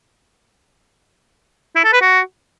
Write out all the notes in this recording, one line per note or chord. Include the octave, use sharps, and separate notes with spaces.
E4
A4
B4
F#4